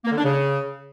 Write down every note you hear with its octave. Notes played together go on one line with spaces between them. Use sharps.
A#3
D3
D4
C#3